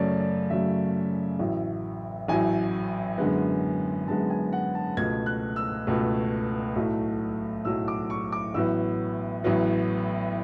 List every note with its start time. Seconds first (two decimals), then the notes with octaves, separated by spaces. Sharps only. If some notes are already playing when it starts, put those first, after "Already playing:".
Already playing: F#2 C#3 F#3 A3 C#5 D5
0.20 D5
0.50 F#2 C#3 F#3 A3 E5
1.39 A1 A2 F#3
2.28 A1 A2 F#3 G#5
3.18 F#2 D3 G#3 B3
4.07 F#2 D3 G#3 B3 A5
4.30 G#5
4.53 F#5
4.75 A5
4.97 C#2 B2 A3 G#6
5.26 F#6
5.56 E6
5.87 C#2 B2 A3
6.76 B1 A2 F#3 A3
7.65 B1 A2 F#3 A3 E6
7.88 D6
8.10 C#6
8.32 D6
8.54 A1 A2 F#3 B3 E6
9.44 A1 A2 F#3 B3